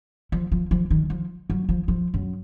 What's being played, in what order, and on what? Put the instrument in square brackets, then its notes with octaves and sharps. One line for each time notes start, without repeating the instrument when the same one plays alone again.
[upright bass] F3
F3
F3
D#3
F3
F#3
F3
F3
F#2